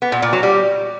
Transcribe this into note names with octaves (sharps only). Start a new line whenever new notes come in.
B3
A#2
A#2
F#3
G3